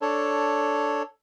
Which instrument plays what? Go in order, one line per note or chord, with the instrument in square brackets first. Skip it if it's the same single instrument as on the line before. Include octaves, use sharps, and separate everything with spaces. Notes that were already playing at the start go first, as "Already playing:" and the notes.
[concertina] D4 A4 C#5